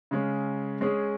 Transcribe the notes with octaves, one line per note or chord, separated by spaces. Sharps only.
C#3 G#3 C#4
G#3 C#4 G#4